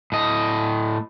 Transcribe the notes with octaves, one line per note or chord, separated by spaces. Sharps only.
A2 D#5